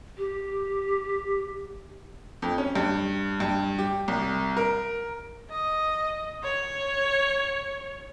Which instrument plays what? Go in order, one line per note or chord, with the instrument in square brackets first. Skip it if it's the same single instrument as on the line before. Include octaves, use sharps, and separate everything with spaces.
[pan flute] G4
[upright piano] F2
C#4
G2
G2
G4
C2
A#4
[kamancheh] D#5
C#5